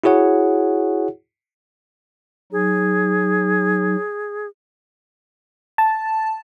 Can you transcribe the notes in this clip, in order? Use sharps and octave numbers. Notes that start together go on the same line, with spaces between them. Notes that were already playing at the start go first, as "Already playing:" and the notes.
E4 F#4 G#4 C#5 F#5
F#3 D#4 G#4
A5